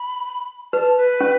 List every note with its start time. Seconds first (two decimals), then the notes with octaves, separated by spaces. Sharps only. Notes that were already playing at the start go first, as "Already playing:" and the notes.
Already playing: B5
0.73 B4 A5
0.97 B4
1.21 C#4